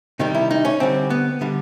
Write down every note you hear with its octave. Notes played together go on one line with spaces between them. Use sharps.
C3 D#3 G3 D#4
E4
D#4
C#4
D3 G3 C4
B3
D3 G3